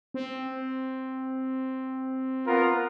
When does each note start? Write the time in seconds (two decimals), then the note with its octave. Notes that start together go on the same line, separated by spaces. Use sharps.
0.14 C4
2.47 B3 F4 A#4